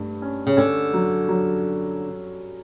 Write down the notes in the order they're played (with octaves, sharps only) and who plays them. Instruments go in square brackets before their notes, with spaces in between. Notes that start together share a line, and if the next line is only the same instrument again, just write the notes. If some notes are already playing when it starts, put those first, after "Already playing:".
Already playing: [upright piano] G2 A3
C#4
[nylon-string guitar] C#3
[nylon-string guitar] D3 [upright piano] C#4
[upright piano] F#3
F#3